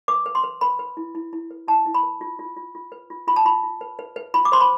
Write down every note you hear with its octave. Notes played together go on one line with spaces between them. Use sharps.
B4 D6
B4
C6
B4
B4 B5
B4
E4
E4
E4
B4
E4 A5
E4
B5
B4
F4
F4
F4
F4
B4
F4
F4 B5
A5
F4 B5
F4
B4
B4
B4
F4 B5
D6
C5 C6
B5